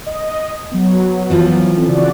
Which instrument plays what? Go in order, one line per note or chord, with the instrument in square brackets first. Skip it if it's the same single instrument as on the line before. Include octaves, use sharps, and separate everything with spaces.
[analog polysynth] D#5
F#3 B3
[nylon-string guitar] E3 F3 F4
[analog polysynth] C4 C#4 A4
C#3 F#4 D5